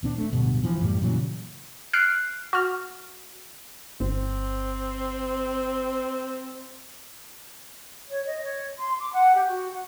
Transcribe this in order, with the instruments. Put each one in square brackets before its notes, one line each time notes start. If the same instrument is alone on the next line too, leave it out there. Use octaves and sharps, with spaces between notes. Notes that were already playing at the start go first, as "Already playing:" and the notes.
[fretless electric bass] D#1 C4 D4
A3
D1 G2 B2
E3 F3
F#2 A2 G3
A#2 C#3 E3 F#3
[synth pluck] F6 F#6 C7 D7
F#4 F6
[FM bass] G1 [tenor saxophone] C4
[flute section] C#5
D#5
C#5
C6
D6
F#5
G4
F#4
F#5